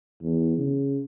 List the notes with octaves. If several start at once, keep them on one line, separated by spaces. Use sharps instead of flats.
E2
C#3